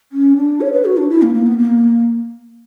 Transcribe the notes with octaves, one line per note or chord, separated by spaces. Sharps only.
C#4
D4
C#5
B4
F#4
D4
E4
A#3
A#3
B3
A#3